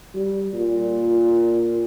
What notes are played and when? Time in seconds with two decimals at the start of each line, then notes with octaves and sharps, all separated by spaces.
0.15 G3
0.53 A#2